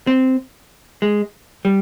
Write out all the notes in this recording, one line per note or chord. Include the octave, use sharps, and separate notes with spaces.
C4
G#3
G3